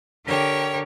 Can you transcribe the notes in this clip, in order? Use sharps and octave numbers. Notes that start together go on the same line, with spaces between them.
D3 G4 A#4 C#5 G5